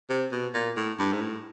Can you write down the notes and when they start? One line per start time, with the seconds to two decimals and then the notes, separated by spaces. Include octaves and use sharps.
0.10 C3
0.32 B2
0.54 A#2
0.77 A2
0.99 G2
1.13 G#2
1.21 A2